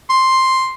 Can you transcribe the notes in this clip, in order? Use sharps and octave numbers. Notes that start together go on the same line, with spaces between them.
C6